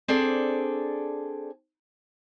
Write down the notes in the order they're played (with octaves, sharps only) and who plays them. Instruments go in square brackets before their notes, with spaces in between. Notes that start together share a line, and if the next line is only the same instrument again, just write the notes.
[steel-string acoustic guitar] C4 D4 G#4 A4 D5